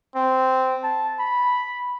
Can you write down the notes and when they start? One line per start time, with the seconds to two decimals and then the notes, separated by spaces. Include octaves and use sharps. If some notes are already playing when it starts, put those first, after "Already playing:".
0.15 C4
0.84 A5
1.20 B5